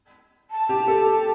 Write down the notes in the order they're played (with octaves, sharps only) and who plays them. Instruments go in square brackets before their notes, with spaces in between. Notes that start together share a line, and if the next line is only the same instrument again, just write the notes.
[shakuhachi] A5
[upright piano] G4
A4